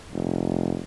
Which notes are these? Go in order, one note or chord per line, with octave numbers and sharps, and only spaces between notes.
F1